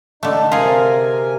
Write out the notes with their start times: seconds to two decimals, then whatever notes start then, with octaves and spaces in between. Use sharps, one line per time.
0.23 D3 A3 D#4
0.52 C3 F4 G#4 A#4 G#5